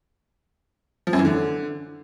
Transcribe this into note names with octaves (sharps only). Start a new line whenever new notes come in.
F3
F#2
E3
D3